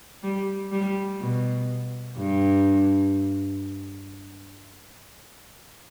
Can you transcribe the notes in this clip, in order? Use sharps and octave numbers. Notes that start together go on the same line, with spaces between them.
G3
G3
B2
G2